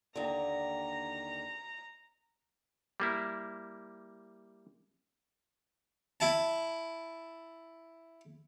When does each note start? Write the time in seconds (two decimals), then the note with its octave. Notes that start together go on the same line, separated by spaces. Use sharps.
0.16 D#2 D3 A#5
3.00 G3 A#3 E4
6.20 E4 A5